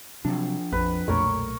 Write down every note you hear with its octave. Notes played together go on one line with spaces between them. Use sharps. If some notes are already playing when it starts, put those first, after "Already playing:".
C3 F3 F#3 D4
A#1 F2 B4
B1 F2 A#2 A3 A#4 C#5 C#6